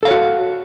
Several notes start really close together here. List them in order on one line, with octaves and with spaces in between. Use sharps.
A4 F5 C#5 F#4